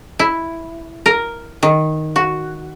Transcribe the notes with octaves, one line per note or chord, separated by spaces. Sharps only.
E4
A#4
D#3
F#4